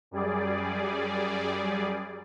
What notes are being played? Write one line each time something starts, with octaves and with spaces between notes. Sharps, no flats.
F#2 G3 G#4 D5